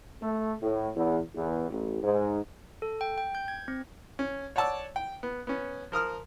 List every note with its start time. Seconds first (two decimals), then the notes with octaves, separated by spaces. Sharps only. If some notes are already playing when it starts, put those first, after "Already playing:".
0.21 A3
0.62 A2
0.96 E2
1.34 E2
1.69 A1
2.02 G#2
2.82 A4
3.01 G5
3.18 G5
3.35 G6
3.48 G#6
3.68 C4
4.19 C#4
4.56 C#5 D5 F#5 A5 D6 E6
4.96 G5
5.23 B3
5.47 B3 C#4
5.92 F3 A#4 D#6 F6